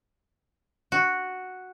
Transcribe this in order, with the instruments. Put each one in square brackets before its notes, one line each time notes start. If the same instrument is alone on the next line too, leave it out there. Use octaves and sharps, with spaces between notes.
[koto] F#4